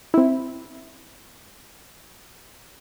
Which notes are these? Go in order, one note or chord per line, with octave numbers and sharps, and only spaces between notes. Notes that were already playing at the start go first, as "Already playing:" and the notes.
C4 E4